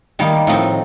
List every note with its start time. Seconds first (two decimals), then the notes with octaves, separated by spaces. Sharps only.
0.19 D#3 G3 A#3 D#4
0.47 A2 F3 C4 D#4